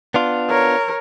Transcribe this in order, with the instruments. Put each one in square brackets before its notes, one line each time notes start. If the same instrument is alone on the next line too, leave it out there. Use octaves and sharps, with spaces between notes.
[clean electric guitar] B3 D4 F4
[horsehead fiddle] A#4 C#5